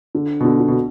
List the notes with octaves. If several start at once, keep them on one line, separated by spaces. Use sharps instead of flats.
D3
B2
D3
D3
B2